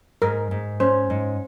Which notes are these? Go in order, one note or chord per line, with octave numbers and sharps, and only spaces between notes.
G#2 A#4
G#2
C#4 C5
G#2